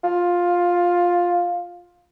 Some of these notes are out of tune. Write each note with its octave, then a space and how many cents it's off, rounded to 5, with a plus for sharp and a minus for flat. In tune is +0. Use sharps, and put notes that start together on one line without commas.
F4 +10